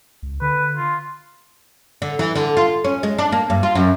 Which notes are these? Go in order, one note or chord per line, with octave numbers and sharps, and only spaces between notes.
C#2
D3 B4
F4
D3
E3
D3
F4
C#4
G#3
D4
A#3
G2
F4
F#2